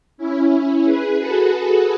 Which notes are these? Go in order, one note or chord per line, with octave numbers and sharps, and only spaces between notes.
C#4 E4
G#4 B4
F#4 A4